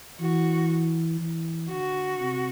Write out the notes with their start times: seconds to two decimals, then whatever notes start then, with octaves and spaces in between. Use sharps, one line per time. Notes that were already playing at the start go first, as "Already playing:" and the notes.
0.20 E3 F#4
1.20 E3
1.70 D3 F#4
2.20 C3